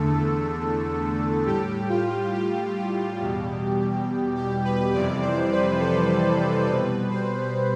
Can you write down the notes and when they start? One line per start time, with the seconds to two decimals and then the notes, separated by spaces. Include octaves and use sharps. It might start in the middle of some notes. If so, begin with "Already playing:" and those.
Already playing: E2 D3 A3 A4
1.46 A2 G3 G4
1.89 F4
2.33 G4
2.77 G4
3.20 E2 B2 G3
4.36 G4
4.64 B4
4.93 F2 C3 E3 G3 D5
5.22 C5
5.51 B4
5.80 A4
6.67 B2 G3 B4
7.10 C5